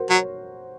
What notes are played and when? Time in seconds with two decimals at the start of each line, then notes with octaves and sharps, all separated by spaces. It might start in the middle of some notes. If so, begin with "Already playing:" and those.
Already playing: F#4 A#4 C5
0.10 F#3 C#5